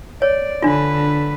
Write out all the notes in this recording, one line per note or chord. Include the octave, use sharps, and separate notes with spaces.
C#5 D5
D3 D4 F4 B4